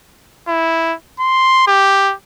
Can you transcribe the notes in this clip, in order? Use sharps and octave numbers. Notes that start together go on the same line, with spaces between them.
E4
C6
G4